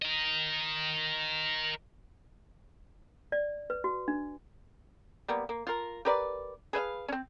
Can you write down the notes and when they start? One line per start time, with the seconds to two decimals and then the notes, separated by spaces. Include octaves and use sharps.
0.02 A#4 D#5
3.32 D5
3.70 B4
3.84 F#4
4.08 D4
5.28 G3 A#3 B3
5.49 A#3
5.67 F4 A#4
6.05 G4 A#4 B4 D5
6.73 G#4 B4 E5 F5
7.08 C4 C#4